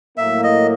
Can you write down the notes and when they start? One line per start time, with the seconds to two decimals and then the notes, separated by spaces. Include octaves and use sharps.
0.17 A2 F#3 A#3 E5
0.43 D#5